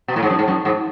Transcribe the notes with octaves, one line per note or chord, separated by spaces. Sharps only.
B2
A2
G#2
F#2
G#2
F#2
G#2